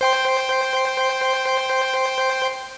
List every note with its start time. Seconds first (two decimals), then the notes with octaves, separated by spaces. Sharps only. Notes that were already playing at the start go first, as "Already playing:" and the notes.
0.01 C5 G5 C6